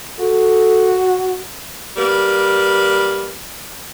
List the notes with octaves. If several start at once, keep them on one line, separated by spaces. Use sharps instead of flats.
F#4 A4
G3 A#3 B4